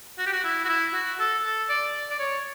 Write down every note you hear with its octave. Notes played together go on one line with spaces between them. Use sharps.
F#4
G4
F#4
E4
F#4
E4
F#4
A4
A4
D5
D5
C#5